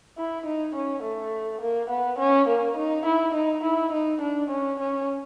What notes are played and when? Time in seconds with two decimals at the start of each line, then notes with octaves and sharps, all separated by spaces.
0.18 E4
0.46 D#4
0.75 C#4
1.03 A3
1.61 A#3
1.90 B3
2.19 C#4
2.48 A#3
2.76 D#4
3.05 E4
3.34 D#4
3.63 E4
3.92 D#4
4.21 D4
4.50 C#4
4.79 C#4